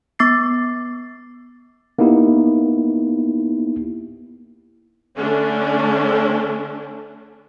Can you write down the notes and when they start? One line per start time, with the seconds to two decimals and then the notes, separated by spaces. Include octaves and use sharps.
0.19 B3 D6 A6 C7
1.99 A#3 B3 D#4 E4 G4
5.17 D3 A3 C#4 D4